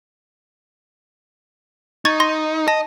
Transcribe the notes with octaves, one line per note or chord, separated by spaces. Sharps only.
D#4 C#6 G#6 A6
C6 A#6
D#5 A5 A#6